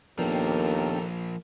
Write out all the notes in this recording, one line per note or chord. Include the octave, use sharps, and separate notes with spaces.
D#2 F3 A#3 B3 D4 A4 A#4 G5